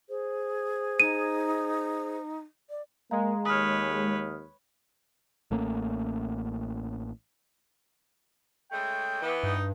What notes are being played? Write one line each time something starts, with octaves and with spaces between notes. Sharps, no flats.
G#4 C5
D#4 D#7
D5
G#3 A#3 F5 A#5
D#2 B4 C#5 D#6 F6
A1 A3 A#3 C#4
C#3 G#3 A3 G5
E3 B3
G2 D#4